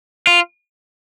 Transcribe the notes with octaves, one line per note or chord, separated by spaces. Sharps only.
F4